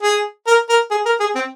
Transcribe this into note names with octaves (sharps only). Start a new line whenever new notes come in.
G#4
A#4
A#4
G#4
A#4
G#4
C4